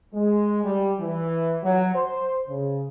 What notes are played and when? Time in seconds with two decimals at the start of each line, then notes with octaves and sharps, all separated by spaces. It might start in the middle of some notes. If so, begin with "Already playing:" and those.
0.13 G#3
0.63 G3
0.99 E3
1.62 F#3
1.94 C5
2.48 C#3